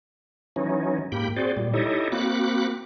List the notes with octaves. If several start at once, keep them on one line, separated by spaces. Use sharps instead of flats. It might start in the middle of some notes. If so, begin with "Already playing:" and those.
E3 F#3 C#4 D#4
G#2 A#3 G4 G5 B5
C4 F#4 G#4 C5 D5
A#2 G3
D#4 E4 G4 A4 C#5 D#5
A#3 C4 F#4 B5 D6 F#6